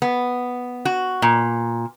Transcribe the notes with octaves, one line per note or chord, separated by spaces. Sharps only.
B3
F#4
A#2